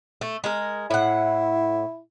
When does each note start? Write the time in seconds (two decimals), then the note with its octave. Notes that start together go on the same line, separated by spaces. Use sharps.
0.21 A3
0.44 G#3 A#4
0.91 A2 E4 F#5